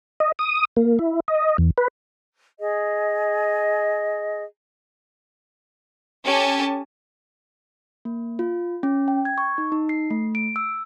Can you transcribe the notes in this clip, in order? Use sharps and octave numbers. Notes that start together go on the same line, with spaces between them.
D#5
D#6
A#3
E4
D#5
E2
B4
G#4 D#5
C#4 G4 A4 G#5 A5
A#3
F4
C#4
G5
G#6
C#6
D#4
D#4
C7
A3
D7
E6